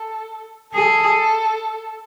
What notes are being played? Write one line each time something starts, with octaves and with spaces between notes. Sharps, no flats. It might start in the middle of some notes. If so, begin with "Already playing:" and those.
Already playing: A4
G#4 A4